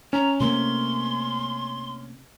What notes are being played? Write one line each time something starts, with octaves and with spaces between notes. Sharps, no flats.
C#4 A#5
C3 A3 A#3 C6